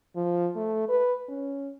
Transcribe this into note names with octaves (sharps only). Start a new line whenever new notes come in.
F3
A3
B4
C#4